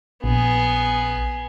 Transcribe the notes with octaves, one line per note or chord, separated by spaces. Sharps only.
A#1 B3 G#4